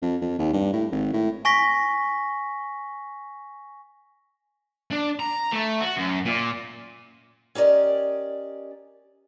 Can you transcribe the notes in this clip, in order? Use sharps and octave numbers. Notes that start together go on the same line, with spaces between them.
F2
F2
D#2
G2
A2
G#1
A2
G#5 C#6 A#6 B6
D4
A#5
A3
F#4
F#2
A#2
C#4 G4 A#4 D5 D#5